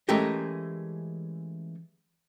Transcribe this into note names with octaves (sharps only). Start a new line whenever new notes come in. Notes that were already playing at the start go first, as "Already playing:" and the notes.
E3 G#3 A3 C#4 G4 A#4